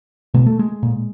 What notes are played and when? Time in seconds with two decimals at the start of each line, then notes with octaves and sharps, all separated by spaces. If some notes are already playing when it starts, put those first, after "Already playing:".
0.34 B2 G#3
0.46 A3
0.59 G#3
0.83 A#2